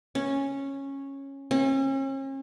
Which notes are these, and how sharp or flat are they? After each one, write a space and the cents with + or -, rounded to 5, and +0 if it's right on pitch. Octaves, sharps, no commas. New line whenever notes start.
C#4 -10
C#4 -40